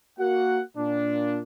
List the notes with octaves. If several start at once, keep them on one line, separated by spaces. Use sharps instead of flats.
A#3 F#4 F#5
A#2 D4